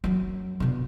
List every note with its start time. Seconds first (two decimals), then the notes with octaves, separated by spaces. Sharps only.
0.04 F#2 F#3
0.60 B2 D3